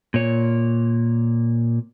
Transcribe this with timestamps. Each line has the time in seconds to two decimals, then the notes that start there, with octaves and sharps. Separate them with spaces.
0.14 A#2 C#5